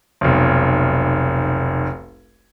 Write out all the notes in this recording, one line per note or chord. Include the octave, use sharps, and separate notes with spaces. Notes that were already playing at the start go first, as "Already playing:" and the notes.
F1 B1